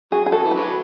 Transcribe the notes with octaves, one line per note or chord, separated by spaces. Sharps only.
F#3 G#4
G#4
F#3 A4
E3
D3 F#3 B4